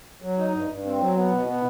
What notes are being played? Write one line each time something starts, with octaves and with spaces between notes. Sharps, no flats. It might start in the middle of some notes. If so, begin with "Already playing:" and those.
F#3
D#4
G2
G2
C4
F#3
B3
B2
B3